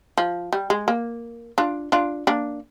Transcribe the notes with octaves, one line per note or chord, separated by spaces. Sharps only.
F3
G3
G#3
A#3
D4 F4
D4 F4
A#3 D4